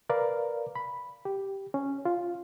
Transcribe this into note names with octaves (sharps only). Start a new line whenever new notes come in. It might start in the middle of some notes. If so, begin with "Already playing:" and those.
A#4 B4 D5 F5
B5
G4
C#4
F4